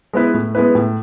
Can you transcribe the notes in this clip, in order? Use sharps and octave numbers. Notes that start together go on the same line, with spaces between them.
G#3 B3 E4 B4
A2
G#3 B3 E4 B4
A2